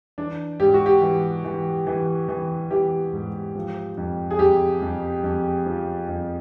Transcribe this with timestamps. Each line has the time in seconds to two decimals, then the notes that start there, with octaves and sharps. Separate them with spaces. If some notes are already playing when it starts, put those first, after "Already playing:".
0.18 E3 D4
0.60 G#2 G4
0.74 F#4
0.86 G4
1.02 E3
1.44 E3
1.87 E3
2.28 E3
2.71 E3 G4
3.13 G#2
3.56 F3
3.97 F2
4.31 G#4
4.39 F2 G4
4.82 F2
5.24 F2
5.66 F3
6.09 F2